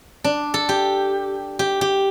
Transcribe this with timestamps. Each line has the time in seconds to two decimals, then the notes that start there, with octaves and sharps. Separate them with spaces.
0.24 D4
0.54 A4
0.69 G4
1.59 G4
1.81 G4